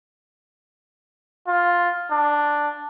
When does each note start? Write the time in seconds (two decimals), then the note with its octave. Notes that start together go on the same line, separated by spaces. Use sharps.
1.48 F4
2.11 D4